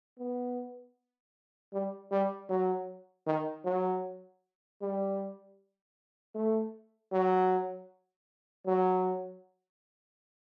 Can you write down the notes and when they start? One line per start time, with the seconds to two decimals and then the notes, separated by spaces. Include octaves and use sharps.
0.19 B3
1.73 G3
2.11 G3
2.49 F#3
3.27 D#3
3.65 F#3
4.82 G3
6.35 A3
7.12 F#3
8.67 F#3